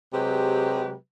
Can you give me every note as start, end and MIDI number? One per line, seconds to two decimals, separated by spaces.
0.13 0.94 48
0.13 0.94 54
0.13 0.94 56
0.13 0.94 67
0.13 0.94 71